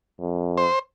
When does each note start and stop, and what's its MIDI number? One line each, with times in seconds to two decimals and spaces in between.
0.20 0.66 41
0.57 0.79 72